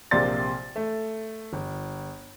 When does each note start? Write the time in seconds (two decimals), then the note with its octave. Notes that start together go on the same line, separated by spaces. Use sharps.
0.11 A#1 C3 A#3 D5 C6 A6
0.76 A3
1.53 G1